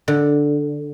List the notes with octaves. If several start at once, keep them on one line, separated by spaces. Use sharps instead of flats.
D3